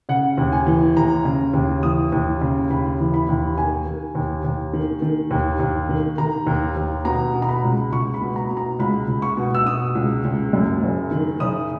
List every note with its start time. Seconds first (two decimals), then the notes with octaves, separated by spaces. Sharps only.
0.09 C#3 F#5
0.38 D#2
0.52 G#5
0.67 E3
0.97 D#2 A#5
1.25 C#3
1.54 D#2
1.83 E3 D#6
2.12 D#2
2.41 C#3
2.70 D#2 B5
2.99 E3
3.14 B5
3.29 D#2
3.58 D#3 G#5
3.86 D#3
4.15 D#2
4.44 D#2
4.74 D#3
5.02 D#3
5.31 D#2
5.60 D#2
5.89 D#3
6.18 D#3 A#5
6.47 D#2
6.76 D#2
7.05 B2 A#5
7.34 B2
7.42 A#5
7.49 B5
7.64 C#2
7.92 C#2 C#6
8.14 B5
8.21 B2
8.36 A#5
8.51 B2
8.57 A#5
8.79 C#2 B5
9.08 C#2
9.22 C#6
9.37 B2
9.55 E6
9.66 B2 D#6
9.95 C#2
10.24 C#2
10.53 F#2
10.83 F#1
11.11 D#3
11.40 F#1 D#6